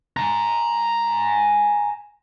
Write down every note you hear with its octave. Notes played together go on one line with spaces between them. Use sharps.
G#5 A#5